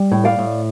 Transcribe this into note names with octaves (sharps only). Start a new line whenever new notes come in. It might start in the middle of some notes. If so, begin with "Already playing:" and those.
Already playing: G3
A2
D5 F5
A2